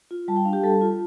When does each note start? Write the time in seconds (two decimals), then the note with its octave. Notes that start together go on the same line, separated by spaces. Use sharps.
0.11 F4
0.28 G3 A5
0.36 G5
0.45 D4 F5
0.53 G4 G5
0.63 G3 A4 A5
0.82 F4